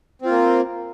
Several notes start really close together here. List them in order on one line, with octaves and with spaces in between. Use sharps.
C4 F4 A#3